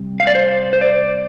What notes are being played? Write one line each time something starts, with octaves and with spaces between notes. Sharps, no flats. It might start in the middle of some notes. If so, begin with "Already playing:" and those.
Already playing: C3 G3
F5
D5
C5
C5
D5